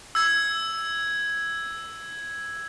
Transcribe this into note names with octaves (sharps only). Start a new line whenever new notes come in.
E6 G#6